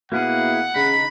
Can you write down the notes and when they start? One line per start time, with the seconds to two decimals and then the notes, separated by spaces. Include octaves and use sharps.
0.12 B2 A#3 E4 G#4 F#5
0.76 C#3 D#4 B5